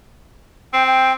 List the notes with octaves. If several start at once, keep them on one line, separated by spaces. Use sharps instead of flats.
C4 G5
G5